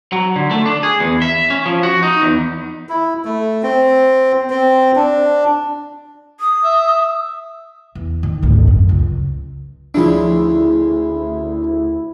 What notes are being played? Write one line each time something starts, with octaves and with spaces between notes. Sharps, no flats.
F#3
D3
A3
D4
G#4
E2
E5
C#4
F3
F#4
D#4
E2
E4
A3
C4
C4
D4
D#6
E5
E2
D#3
G#1 D2
F#2
C#2
D2 C#3 F3 G#3 C#4 D4 E4